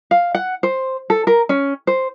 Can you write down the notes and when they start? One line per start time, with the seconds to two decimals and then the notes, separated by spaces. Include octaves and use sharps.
0.11 F5
0.35 F#5
0.63 C5
1.10 A4
1.27 A#4
1.49 C#4
1.87 C5